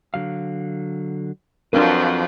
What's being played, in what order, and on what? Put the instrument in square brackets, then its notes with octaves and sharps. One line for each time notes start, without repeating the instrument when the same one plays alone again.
[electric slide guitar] D3 F#3 F5
[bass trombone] F2 [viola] F3 F#3 [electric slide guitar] C4 B4 [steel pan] D4 A#4